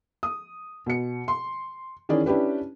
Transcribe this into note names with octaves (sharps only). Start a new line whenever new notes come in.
D#6
B2 C#7
C6
D#3 E3 C#4 G#4 D5
C#4 D4 E4 G4 B4